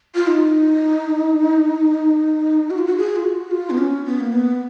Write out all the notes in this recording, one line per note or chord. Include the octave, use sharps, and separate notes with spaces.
F4
D#4
F#4
F4
F#4
G#4
F4
F#4
F4
B3
C#4
B3
A#3
B3